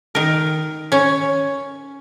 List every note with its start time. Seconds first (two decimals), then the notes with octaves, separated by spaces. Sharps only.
0.15 D#3 A#4
0.92 C#4 C#5